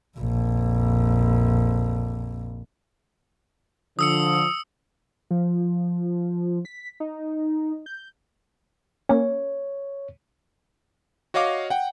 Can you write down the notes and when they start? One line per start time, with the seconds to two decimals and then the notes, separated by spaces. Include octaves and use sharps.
0.18 A#1 F2
3.99 D3 F3 D#6 E6 C#7
5.31 F3
6.65 B6
7.00 D#4
7.86 G6
9.09 A#3 C#4 C#5
11.34 F#4 C#5 D#5 F5 D6
11.70 F#5 G5